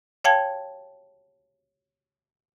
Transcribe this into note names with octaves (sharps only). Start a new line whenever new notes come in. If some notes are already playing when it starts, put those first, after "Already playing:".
C#5 F5 G5 A5 G#6